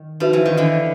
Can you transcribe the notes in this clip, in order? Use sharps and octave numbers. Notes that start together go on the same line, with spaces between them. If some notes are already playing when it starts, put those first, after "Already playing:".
Already playing: D#3
F3 D#4 F#4 B4 E5
E3
D#3
D3 E3